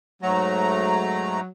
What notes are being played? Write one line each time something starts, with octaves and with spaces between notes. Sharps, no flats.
G#2 F#3 A3 A#5